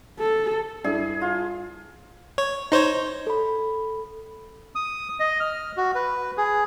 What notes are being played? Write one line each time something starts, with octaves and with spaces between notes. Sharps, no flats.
A4
G2 E4 G#4 D5
F4
C#5
D#4 C5 C#5
A4 B5
D#6
D#5
F6
F#4
B4
G#4